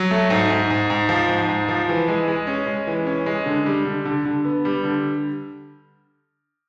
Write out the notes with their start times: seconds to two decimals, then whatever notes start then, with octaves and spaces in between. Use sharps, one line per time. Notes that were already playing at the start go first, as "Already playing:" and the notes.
Already playing: F#3
0.11 A3
0.30 G#2
0.50 G#2
0.70 G#2
0.90 G#2
1.09 F3
1.29 G#2
1.49 G#2
1.69 F3
1.89 E3
2.08 G#3
2.28 G#3
2.47 C#4
2.67 G#3
2.87 E3
3.07 C#4
3.26 G#3
3.46 D3
3.66 G3
3.85 D3
4.05 D3
4.25 D3
4.45 B3
4.65 G3
4.84 D3